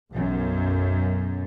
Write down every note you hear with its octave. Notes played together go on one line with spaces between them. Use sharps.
B1 F#2